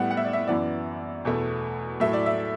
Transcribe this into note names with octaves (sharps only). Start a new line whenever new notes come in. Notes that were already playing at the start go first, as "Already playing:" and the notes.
Already playing: A2 G3 B3 F#5
F#5
E5
D5
E5
F#2 E3 B3 D5
E2 B2 A3
A2 F#3 A3 E5
D5
E5